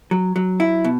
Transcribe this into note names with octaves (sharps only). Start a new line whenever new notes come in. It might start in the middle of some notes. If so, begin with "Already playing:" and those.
F#3
F#3
E4
B2